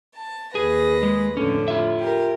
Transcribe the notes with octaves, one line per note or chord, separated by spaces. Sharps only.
A5
D#2 G#4 B4 A#6
G#3
F2 A2 D3 C#4
F4 E5
G4 A#4